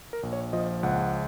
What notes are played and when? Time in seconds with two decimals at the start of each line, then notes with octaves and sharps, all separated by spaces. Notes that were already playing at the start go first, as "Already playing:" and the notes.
0.13 A#4
0.23 A#1
0.33 C#5
0.53 F3 D#5
0.83 C#2 F#5